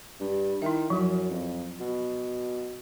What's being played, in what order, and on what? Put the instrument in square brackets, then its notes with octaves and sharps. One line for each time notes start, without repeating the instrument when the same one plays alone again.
[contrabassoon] G2
[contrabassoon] D#3 [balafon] E4 E5
[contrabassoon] F#2 [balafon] F3 F#3
[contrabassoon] F2
B2